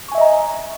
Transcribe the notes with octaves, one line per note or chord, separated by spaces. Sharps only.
D#5 E5 G#5 A#5 C#6